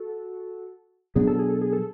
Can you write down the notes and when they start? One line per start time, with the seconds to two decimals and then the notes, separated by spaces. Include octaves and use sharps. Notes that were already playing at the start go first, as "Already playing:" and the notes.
Already playing: F#4 A4
1.15 B2 F#3 B3 D4 G#4
1.27 A4
1.39 G#4
1.50 A4
1.61 G#4
1.73 A4